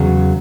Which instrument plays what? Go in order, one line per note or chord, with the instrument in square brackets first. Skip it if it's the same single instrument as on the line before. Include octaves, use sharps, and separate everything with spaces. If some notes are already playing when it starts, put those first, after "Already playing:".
Already playing: [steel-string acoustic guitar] E2 C#3 F#3